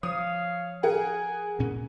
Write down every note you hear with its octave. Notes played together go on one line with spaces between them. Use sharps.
F3 C#5 F5 D#6
G#4 A#4 F#5 G#5
D2 A#2 C#4